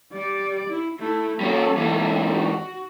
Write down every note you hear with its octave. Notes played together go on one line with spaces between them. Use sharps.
G3 D5
E4
A3 E4
G3 A#3 C#4 A4
G#2 E3
F#4